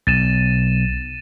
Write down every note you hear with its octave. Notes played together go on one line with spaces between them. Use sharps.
B1 A6 D#7 E7